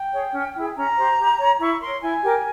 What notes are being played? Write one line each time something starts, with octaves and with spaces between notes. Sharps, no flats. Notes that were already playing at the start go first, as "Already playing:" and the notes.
Already playing: G5
G#4 C#5
C#4
E4 G#4
C#4 A#5
G4 C5
G4
C#5
E4 C#6
A#4 C#5 C6
E4 G#5
G4 A#4